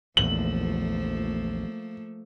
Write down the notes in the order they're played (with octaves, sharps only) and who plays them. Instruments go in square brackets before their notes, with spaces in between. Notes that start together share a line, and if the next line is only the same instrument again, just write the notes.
[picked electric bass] A#1 E2 [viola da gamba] F3 A3 A#3 [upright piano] F#7